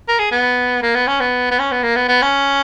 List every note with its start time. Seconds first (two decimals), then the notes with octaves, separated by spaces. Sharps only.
0.08 A#4
0.19 G#4
0.32 B3
0.82 A#3
0.95 B3
1.07 C#4
1.21 B3
1.51 B3
1.59 C#4
1.72 B3
1.83 A#3
1.96 B3
2.09 B3
2.22 C#4